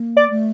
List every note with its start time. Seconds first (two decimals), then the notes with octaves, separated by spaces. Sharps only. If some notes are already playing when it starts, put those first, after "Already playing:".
Already playing: A#3
0.17 D5
0.30 A3